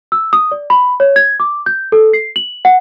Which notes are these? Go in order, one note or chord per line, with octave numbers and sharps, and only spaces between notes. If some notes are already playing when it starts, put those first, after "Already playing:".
E6
D#6
D5
B5
C#5
G#6
D6
G6
A4
C7
F#7
F#5